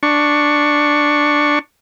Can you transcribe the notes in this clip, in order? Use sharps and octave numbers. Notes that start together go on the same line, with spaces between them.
D4 C#6